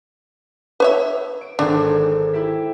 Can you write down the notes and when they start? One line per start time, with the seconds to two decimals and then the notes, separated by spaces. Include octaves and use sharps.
0.80 B4 C#5 E5
1.41 D7
1.59 G#1 D4 A4 C5
2.33 E4 G4 E5